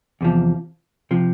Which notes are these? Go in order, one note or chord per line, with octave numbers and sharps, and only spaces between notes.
E2 C3 F3
C3 F3